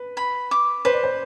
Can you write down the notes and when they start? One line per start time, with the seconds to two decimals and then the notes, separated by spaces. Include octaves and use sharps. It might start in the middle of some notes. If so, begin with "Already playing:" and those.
Already playing: B4
0.17 B5
0.51 D6
0.85 B4 C5
0.93 D5
1.04 C5